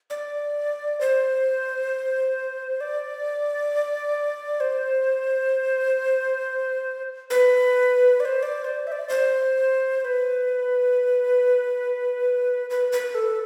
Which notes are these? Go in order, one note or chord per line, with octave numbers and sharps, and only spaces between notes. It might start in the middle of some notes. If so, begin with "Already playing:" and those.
D5
C5
D5
C5
B4
D5
C5
D5
C5
E5
D5
C5
C5
B4
B4
B4
A4